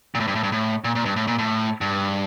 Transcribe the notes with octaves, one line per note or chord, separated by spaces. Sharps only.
A#2
A2
G2
A2
G2
A2
A#2
A#2
G2
A2
A#2
A2
G2